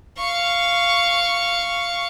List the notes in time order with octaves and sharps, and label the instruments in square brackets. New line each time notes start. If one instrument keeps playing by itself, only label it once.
[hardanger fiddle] F5 C#6